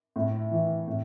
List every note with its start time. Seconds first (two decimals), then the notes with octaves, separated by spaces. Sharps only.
0.16 A2
0.51 E3
0.88 A2